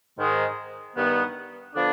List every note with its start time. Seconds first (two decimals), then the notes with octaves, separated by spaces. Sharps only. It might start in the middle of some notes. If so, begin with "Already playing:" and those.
0.18 G#2 D#3 G#3
0.96 G2 D#3 B3
1.74 D3 F3 B3 D4